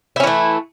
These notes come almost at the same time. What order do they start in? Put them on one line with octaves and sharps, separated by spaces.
E4 C#4 E3 A3